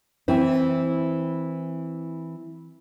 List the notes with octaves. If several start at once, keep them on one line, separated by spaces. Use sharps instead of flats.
E3 C4 E4